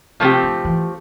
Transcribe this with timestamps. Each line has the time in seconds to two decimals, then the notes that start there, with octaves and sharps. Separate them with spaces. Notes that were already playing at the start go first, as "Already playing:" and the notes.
0.20 C3 F3 A3 C4 G4
0.43 D3
0.65 E3